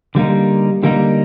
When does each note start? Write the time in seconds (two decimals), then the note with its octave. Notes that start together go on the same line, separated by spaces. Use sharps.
0.15 D3 G3 A#3 D#4
0.83 D3 G3 A#3 D#4